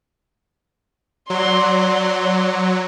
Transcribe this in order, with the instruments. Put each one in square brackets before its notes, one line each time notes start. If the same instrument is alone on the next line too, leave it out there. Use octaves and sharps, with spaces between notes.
[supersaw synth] F#3 [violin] D5 C6